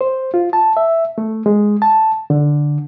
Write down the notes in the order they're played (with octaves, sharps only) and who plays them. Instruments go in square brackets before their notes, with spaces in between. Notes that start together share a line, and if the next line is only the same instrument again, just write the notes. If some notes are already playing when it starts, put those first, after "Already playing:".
[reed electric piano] C5
F4
A5
E5
A3
G#3
A5
D3